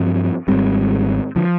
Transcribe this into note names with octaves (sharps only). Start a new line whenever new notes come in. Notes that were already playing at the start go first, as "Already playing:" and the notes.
Already playing: G2 F3 C4
G#1 G#2 G3 C4
D3 F3